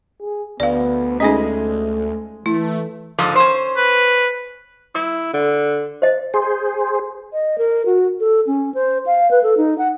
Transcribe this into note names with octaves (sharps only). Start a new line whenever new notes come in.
G#4
D2 B3 D5 F5
G#3 A3 C#4 D#4 G#4 D#5
E3 A3 E4
G#2 D3 F3
C#4 C5
B4
E4 D#6
D3
C5 D#5
G#4 C5
D#5
A#4
F#4
A4
C#4
C5
F5
B4
A4
D#4
F#5